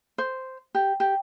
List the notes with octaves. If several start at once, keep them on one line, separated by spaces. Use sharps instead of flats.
C5
G4
G4